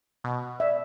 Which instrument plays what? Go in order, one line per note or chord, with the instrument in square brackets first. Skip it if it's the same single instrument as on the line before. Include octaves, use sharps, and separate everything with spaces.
[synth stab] B2
[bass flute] D5 [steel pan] E5